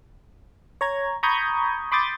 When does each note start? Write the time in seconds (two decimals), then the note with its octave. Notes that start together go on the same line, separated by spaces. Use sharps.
0.81 C#5 A#5 G#6
1.23 A#5 B5 C#6 D#6 G6 G#6
1.92 B5 C6 D6 D#6 G6 A6